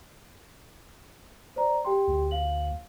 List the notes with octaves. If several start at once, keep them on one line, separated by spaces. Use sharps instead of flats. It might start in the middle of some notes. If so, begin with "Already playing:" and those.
C5 D5 A#5
G4 G5 C6
D2
F5 F#7